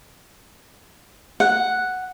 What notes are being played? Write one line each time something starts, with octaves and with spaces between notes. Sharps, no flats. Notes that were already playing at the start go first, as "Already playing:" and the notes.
F#5